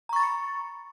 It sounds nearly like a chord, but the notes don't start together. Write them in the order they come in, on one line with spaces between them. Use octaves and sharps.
A#5 C#6 A6 B5 C#7